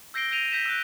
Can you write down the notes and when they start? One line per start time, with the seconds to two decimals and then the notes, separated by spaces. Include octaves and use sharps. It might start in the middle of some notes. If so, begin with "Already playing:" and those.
0.14 E6 G6 A#6 C7 D7 G7
0.31 G6 A#6 D7 D#7 F7
0.52 G6 A#6 B6 E7
0.66 E6 F#6